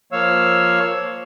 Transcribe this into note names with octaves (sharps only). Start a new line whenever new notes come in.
F3 A#3 C#5 F5 E6